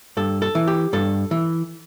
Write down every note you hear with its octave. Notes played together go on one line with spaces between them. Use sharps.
G2 A4
A4
E3
G4
G2 A4
E3